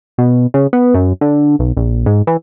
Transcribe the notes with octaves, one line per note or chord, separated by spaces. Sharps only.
B2
C#3
B3
F#2
D3
B1
A#1
G#2
E3